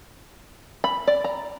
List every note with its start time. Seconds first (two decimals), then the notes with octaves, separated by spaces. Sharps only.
0.84 B5
1.07 D5
1.24 A#5